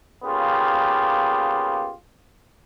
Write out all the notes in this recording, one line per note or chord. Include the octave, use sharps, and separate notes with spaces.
C#3 A#3 B3 F4 G4